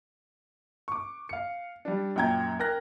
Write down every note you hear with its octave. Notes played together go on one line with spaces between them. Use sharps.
C#6 D6
F5 C#7
G3 D4
F#2 A#2 G5 A#5 G#6
A#4 G5 F6 F#6 A#6